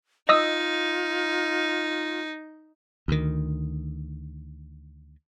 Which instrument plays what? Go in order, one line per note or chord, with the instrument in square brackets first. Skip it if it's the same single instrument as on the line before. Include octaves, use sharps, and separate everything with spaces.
[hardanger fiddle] D#4 [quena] F4 [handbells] D#5 D#6 E6
[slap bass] D2 D#3